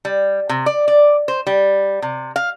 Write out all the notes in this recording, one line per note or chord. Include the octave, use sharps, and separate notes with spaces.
G3
C3
D5
D5
C5
G3
C3
F5